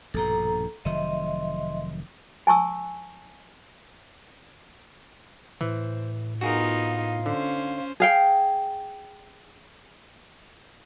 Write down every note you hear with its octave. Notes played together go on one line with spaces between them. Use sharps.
A#1 G2 B2 A4 A#5
F1 D#3 F#3 D#5 E5 C6
G#5 A5 C#6 E6
A2 E3 C5
B3 D#4 F4 F#4 G#4 A#4 F5
D3 C#4 C5
G#4 F5 G5